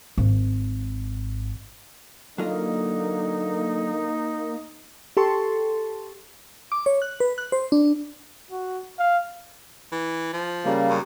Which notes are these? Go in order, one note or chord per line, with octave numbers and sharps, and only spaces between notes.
G#1
D3 F#3 A#3 D#4 F4 D#5
G4 A4 A5 C6 C#6
D6
C#5
F#6
B4
F#6
C5
D4
F#4
F5
E3
F3
C#3 G3 A#3
F#2